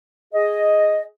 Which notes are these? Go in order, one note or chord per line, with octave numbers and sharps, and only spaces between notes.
G#4 D#5